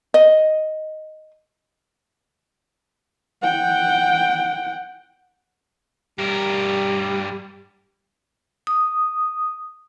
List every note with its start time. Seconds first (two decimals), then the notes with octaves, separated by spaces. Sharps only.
0.14 D#5
3.42 F#5 G5
6.18 G2 G3 A#4
8.67 D#6